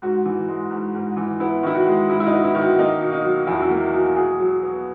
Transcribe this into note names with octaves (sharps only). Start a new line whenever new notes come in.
G#2 F#4
E3
G#3
G#2
G#2
E3
B3 E4
D#3 E4
F#4
G#3
G#2 E4
E4
D#4
B3
E4
D#3
F#4
A#3 D#4
B2
D#4
F#3
E2 E4
F#4
E4
A#3
B2
B2 G#4
F#3
B3